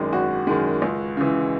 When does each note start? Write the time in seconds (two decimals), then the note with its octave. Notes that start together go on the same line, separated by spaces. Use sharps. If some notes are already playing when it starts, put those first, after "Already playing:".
Already playing: G#1 F#2 D#3 G#3
0.12 G#1 F#4
0.47 F#2 D#3 G#3
0.82 C#2
1.17 C#3 E3